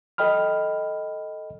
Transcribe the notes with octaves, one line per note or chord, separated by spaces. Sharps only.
A4 D#5 G5 B5 F6